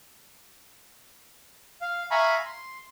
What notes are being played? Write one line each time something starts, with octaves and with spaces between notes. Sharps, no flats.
F5
E5 F5 G#5 A#5 B5 C#6
C6